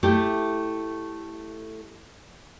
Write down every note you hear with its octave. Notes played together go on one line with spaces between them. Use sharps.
A3 E4 G4 A4